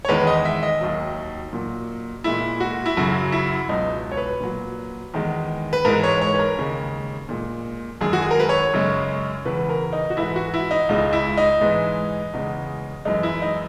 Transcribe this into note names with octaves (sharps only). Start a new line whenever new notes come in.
C#5
E2 D#3 G#3 B4
D#5
E5
D#5
D#2 D#3 F#3
A#2 F#3
A#2 G#3 E4
F#4
E4
F#2 C#3 F#3 F#4
E4
C#2 B2 F#3 D#4
C#5
B4
A#2 F#3
E2 D#3 G#3
B4
G#2 E3 G#3 A#4
C#5
C#5
B4
A#4
D#2 C#3 G#3
A#2 G#3
F#2 D#3 G#3 G#4
F#4
G#4
A#4
B4
C#5
F#2 C#3 G#3
E2 C#3 E3 B4
A#4
D#4
F#4
G#2 E3 G#3 E4
F#4
E4
D#4
C#2 C#3 G#3 D#4
E4
D#4
G#2 E3 G#3
E2 C#3 G#3
F#2 E3 G#3 D#4
E4
D#4